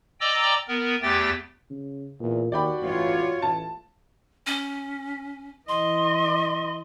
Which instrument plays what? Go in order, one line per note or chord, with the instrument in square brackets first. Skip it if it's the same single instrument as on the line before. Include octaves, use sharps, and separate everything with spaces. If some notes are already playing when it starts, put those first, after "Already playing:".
[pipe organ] D5 D#5 G5 A#5 D6 E6
B3 A#4
E2 A3 G4 G5 A6
[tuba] C#3
[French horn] E2 [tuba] A#2
[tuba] D#2 [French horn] F#4 [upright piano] D5 G5 B5
[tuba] A1 [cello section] A3 F4 C#5
[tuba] A1 [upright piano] A5
[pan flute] C#4
[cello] E3 D#5 [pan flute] C6